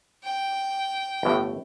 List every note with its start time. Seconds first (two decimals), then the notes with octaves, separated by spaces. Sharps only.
0.24 G5
1.23 G1 A2